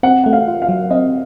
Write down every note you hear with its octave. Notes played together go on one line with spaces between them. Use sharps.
C4 F#5
A3 F#5
F5
F4
F5
F#3
C4 D#5